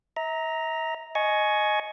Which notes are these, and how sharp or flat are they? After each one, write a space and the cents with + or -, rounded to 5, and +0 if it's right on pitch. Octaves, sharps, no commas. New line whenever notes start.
E5 -40 A#5 +0
D#5 -5 G#5 +20 C#6 +0